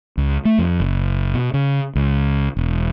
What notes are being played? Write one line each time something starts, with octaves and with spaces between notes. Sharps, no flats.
C#2
A3
F2
F#1
B2
C#3
C#2
E1